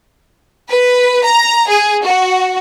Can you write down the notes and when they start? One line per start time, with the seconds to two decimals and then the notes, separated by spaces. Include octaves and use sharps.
0.69 B4
1.24 A#5
1.69 G#4
2.04 F#4